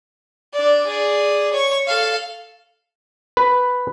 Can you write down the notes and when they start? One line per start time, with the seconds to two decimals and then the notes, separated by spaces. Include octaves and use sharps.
0.54 D4 D5
0.87 G#4 D5
1.53 C#5 C#6
1.87 A4 F5
3.37 B4